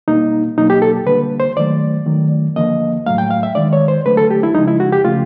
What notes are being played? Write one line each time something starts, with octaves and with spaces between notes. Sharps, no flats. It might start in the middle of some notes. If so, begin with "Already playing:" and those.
B2 G3 A#3 D#4
B2 F#3 A#3 D#4
G4
A4
D3 G3 A#3 B4
C5
D#3 F#3 A3 D5
D#3 F#3 A3
D3 F3 A#3 D#5
A2 F#3 A3 F5
G5
F5
E5
D#3 G#3 D5
C#5
C5
D3 F#3 A3 B4
A4
G4
E4
C#3 F3 G#3 D#4
E4
F#4
G4
C#3 F3 A3 F4